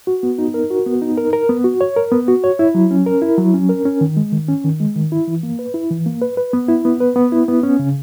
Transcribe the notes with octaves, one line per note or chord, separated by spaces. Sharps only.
F#4
B3
D#4
A#4
F#4
B3
D#4
A#4
A#4
B3
F#4
C#5
A#4
B3
F#4
C#5
E4
F#3
C#4
A#4
E4
F#3
C#4
A#4
C#4
D#3
G#3
D#3
C#4
D#3
G#3
D#3
E4
E3
A#3
B4
E4
E3
A#3
B4
B4
B3
E4
B3
B4
B3
E4
B3
C#4
C#3